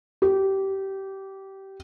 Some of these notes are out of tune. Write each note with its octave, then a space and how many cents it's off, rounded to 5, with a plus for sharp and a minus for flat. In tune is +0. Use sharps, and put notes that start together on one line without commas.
G4 -20